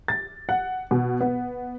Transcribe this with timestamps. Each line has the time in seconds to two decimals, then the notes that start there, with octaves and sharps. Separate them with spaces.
0.08 A6
0.49 F#5
0.91 B2
1.21 B3